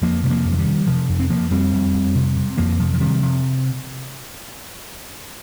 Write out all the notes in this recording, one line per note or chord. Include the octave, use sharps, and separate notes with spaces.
F2 F3 A#3
C3 G3
F3 A#3
F2
F3
D#3 G3
F2
C3 F3
F2
C4
F2 F3 A#3
F2 G3 C4
F2
F2
C3
C3
F2 F3 A#3
C3 F3
F3
C3 D#3 G3
C3 F3